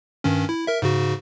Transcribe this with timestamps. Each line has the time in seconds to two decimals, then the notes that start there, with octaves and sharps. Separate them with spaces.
0.24 G2 D#3 C#4
0.49 E4
0.67 A#4 E5
0.82 G#2 C#3 F#4